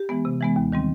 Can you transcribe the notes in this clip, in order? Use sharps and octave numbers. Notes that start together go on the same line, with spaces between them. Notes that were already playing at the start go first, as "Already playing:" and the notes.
Already playing: G4
E3 G#3 B3
C3
E3 G#3 B3
D#2
D#3 G3 C4